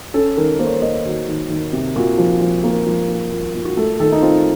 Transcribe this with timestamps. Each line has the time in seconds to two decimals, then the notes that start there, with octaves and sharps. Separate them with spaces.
0.14 C#4 A4
0.37 D#3 A#4
0.59 A#3 C5
0.67 C#5
0.74 C5
0.82 A#3 D#5
1.05 D#3 F#4
1.28 D#3
1.50 D#3
1.73 C3
1.96 A#2 F#4
2.18 F3
2.41 F3
2.64 A#3
2.86 F3
3.09 A#3
3.31 A#2
3.54 A#2
3.65 F#4
3.77 A3 A4
4.00 D#3 A4
4.12 D#4
4.22 C4 F4